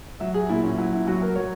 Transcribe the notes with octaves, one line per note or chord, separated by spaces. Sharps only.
F#3 E5
G#4
A#2 E4
C#4
F#3 E4
E4
F#3 F#4
A#4
F#3 C#5